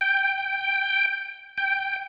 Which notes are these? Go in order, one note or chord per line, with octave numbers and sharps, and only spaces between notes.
G5
G5